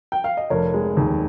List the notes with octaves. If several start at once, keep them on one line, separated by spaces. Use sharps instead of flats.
G5
F5
D#5
F1 A#4 C#5
G#3
D#2